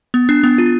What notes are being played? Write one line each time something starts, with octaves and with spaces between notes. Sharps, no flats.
B3
D4
B3
F4